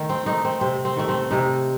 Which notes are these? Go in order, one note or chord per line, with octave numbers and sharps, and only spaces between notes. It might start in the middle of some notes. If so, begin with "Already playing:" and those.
Already playing: D#3 A3
C4
A3 D#4
C4
C3 C4
C4
D#3 A3
C4
C3 D#4